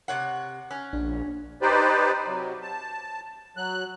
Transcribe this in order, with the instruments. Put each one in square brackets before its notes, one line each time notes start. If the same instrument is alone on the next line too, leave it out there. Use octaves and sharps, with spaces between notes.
[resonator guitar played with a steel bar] C3 C#5 F#5
[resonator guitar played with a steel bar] C#4 [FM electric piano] F#6
[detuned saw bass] A#1 [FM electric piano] D4
[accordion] D#4 G4 B4 C5 D5
C3 F#3
A5
F#3 F#6